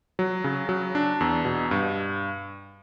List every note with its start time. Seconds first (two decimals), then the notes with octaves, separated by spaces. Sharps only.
0.19 F#3
0.44 C#3
0.69 F#3
0.95 D4
1.21 E2
1.45 B2
1.71 G2